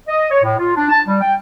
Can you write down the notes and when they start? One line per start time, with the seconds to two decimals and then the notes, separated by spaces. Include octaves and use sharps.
0.07 D#5
0.31 C#5
0.43 A2
0.58 F4
0.76 D4
0.90 A5
1.07 G3
1.21 G5